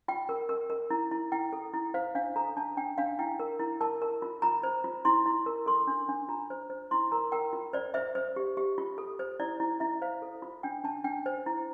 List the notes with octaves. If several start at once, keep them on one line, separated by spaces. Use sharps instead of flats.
F4 G5
A#4
A#4
A#4
E4
E4
E4 G5
A4
E4
C5 F5
D4 F5
A4 A#5
D4 A5
D4 G5
D4 F5
E4 G5
A#4
E4
A#4 A5
A#4
F4
F4 A#5
C5
F4
E4 C6
E4
A#4
A4 C6
D4
D4
F4 A#5
C5
C5
E4 C6
A#4 A#5
A#4 G5
F4
C5 D5
C5 E5
C5
G4
G4
F4
A4
C5
E4 D5
E4
E4 E5
C5 F5
A4
F4
D4 G5
D4 A5
D4 G5
C5
E4